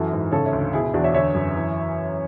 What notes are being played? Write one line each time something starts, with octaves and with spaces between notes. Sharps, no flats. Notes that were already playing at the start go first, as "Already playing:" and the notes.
Already playing: F#2 E3 F#4 A4
G#2
C#3 A4 C#5
C#5 E5
D2
B2 E4 G#4
E4
E2 D4 F#4
C#5 E5
D3 C#5 E5
F#2
E3